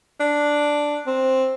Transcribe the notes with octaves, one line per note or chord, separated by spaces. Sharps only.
D4
C4